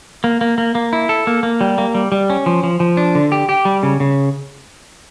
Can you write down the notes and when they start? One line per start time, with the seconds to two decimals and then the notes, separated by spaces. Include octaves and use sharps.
0.24 A#3
0.41 A#3
0.58 A#3
0.75 A#3
0.93 E4
1.09 A4
1.27 A#3
1.43 A#3
1.61 G3
1.78 A#3
1.95 G3
2.12 G3
2.30 C#4
2.46 F3
2.63 F3
2.80 F3
2.97 D4
3.15 D3
3.32 G4
3.49 G4
3.65 G3
3.83 C#3
4.00 C#3